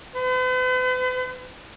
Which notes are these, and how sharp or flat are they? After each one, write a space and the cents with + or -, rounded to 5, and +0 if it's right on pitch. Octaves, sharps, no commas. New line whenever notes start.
B4 +45